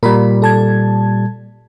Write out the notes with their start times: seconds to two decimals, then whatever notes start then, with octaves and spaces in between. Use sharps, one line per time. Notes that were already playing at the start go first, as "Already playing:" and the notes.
0.03 A#2 G3 A#4 B5
0.42 A4 A5 G#6